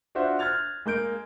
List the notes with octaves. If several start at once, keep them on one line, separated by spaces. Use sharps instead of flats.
D4 F4 F#4 C5 E5
F6 F#6 G#6 A6 F7
G#3 A#3 G6 D7